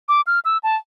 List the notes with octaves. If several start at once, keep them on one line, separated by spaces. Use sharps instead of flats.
D6
F6
E6
A5